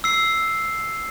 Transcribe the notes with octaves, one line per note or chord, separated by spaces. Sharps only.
E6 C7